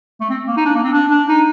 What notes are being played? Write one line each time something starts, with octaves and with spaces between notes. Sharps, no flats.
A3
C4
A#3
D#4
D4
A#3
C4
D4
D4
D#4